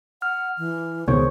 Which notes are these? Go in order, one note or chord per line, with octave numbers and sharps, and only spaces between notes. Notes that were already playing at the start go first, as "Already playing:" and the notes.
F#5 F6
E3
C#2 B2 D#3 G#4 C5 C#5 C#6